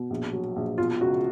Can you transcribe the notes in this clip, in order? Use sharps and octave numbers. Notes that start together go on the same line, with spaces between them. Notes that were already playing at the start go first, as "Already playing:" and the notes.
Already playing: B2
A#1
F#3
A#1
B2 F4
C#2 F#4